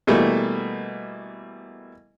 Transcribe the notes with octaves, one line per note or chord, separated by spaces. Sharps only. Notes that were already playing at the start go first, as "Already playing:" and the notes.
B2 E3 G3 A3 A#3